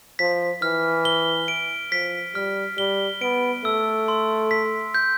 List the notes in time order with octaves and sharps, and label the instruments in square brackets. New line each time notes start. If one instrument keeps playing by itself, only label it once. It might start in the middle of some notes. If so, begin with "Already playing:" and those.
[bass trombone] F3 [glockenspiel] B6
[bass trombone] E3 [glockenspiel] F6
[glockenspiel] G7
D7
[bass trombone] F3 [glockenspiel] B6
[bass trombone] G3 [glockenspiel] F6
[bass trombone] G3 [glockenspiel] G7
[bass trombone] B3 [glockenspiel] D7
[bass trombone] A3 [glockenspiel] E6
[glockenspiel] C6
B6
G6